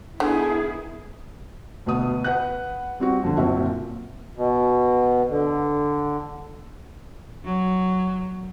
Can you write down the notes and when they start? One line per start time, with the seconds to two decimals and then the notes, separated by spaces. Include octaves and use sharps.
0.20 D3 D#3 B3 E4 G#4
1.86 D2 B2 B3 D#6
2.24 B4 F#5 F#6
3.00 G3 C4 F#4
3.23 F2 D3
3.37 F#1 A#2 C4 F#4 E5
4.37 B2
5.30 D3
7.45 F#3